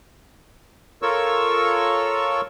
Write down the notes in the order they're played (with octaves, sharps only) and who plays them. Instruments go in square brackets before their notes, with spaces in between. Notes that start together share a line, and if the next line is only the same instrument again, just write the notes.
[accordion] F4 A4 A#4 C#5 C#6 E6